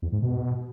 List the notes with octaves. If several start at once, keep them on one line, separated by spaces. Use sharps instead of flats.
E2
G#2
B2